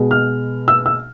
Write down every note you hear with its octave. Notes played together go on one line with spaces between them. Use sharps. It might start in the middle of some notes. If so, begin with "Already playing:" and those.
Already playing: B2 G#3
F6
E6
E6